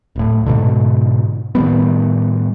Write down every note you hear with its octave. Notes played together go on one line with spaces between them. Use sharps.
D1 A2
G#2 B2 D3
A2 D#3 G3 B3